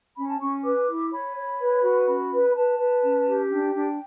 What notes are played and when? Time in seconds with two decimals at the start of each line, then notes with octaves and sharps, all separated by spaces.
0.17 C#4 B5
0.28 A5
0.40 C#4 C#6
0.64 B4 D6
0.88 E4
1.11 C#5 B5
1.36 C#5
1.59 B4
1.83 F#4
2.07 C#4 B5
2.32 B4
2.49 B5
2.55 B4 A5
2.78 B4
3.03 C#4
3.26 G4
3.50 D4 G5
3.74 D4